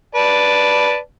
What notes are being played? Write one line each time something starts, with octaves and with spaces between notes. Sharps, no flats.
B4 D5 A5